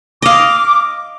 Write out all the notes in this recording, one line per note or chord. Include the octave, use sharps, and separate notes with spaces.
D#5 F5 D6